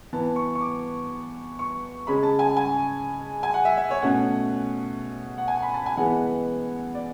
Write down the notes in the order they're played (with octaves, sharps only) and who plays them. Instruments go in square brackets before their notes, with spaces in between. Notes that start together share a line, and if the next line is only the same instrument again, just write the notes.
[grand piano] E3 B3 A5
C#6
C#6
D6
C#6
C#3 G#3 C#4 B5
A5
G#5
G#5
G#5
F#5
E5
E5
C#5
B2 A3 C#4 F#5
F#5
G#5
B5
A5
G#5
E3 G#3 B3 F#5
D5